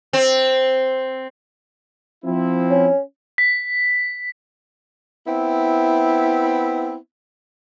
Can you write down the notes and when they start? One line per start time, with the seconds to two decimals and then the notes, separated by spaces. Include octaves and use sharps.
0.13 C4
2.25 F3 C4 E4
2.70 C#4
3.38 B6
5.27 B3 C4 E4